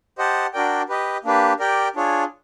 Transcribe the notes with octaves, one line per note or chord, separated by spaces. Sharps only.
G4 C5 D#5 F#5 A5
D4 F#4 A#4 D5 G5
G4 B4 D#5
A#3 D4 G4 B4
G4 A#4 D5 G5
D4 F4 G#4 C#5